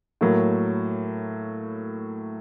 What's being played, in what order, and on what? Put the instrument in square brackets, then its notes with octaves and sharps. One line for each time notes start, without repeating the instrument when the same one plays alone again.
[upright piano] A2 F#3 A#3